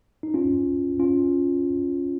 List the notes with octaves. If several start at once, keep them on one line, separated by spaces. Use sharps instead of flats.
D#4
C#4 F4
C#4 F4